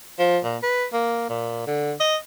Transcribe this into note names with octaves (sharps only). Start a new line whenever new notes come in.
F3
A#2
B4
A#3
A#2
D3
D#5